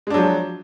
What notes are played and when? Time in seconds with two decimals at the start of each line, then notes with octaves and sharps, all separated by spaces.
0.07 G#3
0.10 D4
0.14 F#3
0.18 F3